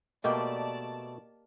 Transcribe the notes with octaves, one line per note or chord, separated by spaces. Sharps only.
B2 A3 A#3 G4 D5 D#5 A5